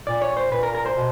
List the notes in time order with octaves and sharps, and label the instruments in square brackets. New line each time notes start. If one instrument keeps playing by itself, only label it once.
[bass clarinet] A#2 [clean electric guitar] D5
[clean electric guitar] C#5
C5
[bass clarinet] A#2 [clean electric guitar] B4
[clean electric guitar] A#4
A#4
C5
[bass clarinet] B2